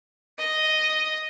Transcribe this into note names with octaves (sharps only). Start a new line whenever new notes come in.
D#5